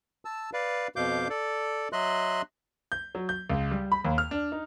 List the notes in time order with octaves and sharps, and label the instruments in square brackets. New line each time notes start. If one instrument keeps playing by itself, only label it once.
[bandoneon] A5 E6
B4 D5 F5
F2 B2 F5 D6 G6
A4 D5
F#3 D#5 E5 C6 F#6
[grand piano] G6
F#3
G6
C#2
G3
B5
D#2
F6
D4
D#4